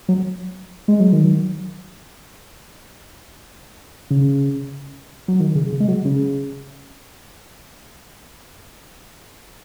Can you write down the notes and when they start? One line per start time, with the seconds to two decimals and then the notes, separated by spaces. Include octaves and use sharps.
0.08 F#3
0.88 G#3
1.00 F#3
1.13 D#3
1.25 F#3
4.10 C#3
5.28 F#3
5.40 D#3
5.55 C#3
5.72 C#3
5.80 G#3
5.88 F#3
6.05 C#3